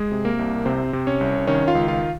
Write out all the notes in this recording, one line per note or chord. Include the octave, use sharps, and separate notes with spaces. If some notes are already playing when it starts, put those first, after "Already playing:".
Already playing: G#3 G#4
C3
A#3 A#4
C2
C3 C4 C5
C3
C#4 C#5
C2
D#3 C#4 C#5
F4 F5
C#2
F4 F5